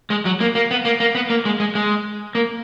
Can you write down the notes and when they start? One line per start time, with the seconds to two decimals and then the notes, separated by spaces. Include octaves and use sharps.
0.10 G#3
0.25 F#3
0.41 A#3
0.55 A#3
0.71 B3
0.85 A#3
1.00 A#3
1.15 B3
1.30 A#3
1.45 G#3
1.60 G#3
1.75 G#3
2.35 A#3